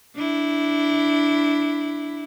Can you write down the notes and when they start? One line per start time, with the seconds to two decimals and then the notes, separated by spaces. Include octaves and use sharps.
0.15 D4 E4